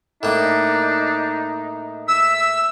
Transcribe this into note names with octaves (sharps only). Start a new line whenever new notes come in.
A2 A#3 D4 D#4
E5 E6